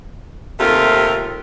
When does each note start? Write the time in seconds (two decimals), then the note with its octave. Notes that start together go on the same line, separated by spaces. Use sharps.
0.60 D#2 C3 A3 F4 A#4